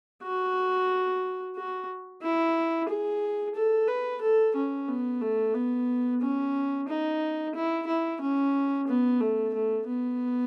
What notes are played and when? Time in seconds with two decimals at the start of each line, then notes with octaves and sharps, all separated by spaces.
0.23 F#4
1.56 F#4
2.22 E4
2.88 G#4
3.55 A4
3.88 B4
4.21 A4
4.55 C#4
4.88 B3
5.21 A3
5.54 B3
6.21 C#4
6.88 D#4
7.55 E4
7.87 E4
8.21 C#4
8.87 B3
9.21 A3
9.54 A3
9.87 B3